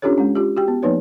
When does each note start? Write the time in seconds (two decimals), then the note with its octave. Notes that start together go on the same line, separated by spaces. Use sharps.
0.02 C#4 D4 F4 G4 A4 C#5
0.18 G#3 C#4
0.35 F4 G4
0.57 F#4 G4 G5
0.68 B3
0.83 F3 A#3 B3 D#4 B4 C#5